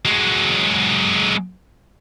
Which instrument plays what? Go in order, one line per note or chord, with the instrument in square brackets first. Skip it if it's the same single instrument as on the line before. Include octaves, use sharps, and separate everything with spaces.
[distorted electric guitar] F#3 G#3